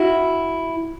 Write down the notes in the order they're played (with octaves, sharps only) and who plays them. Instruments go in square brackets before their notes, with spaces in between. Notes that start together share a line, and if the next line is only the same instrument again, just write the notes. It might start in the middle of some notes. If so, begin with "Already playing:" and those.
Already playing: [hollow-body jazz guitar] E4 F#4